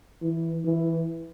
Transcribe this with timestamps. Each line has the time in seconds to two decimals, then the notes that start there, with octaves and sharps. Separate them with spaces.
0.22 E3
0.64 E3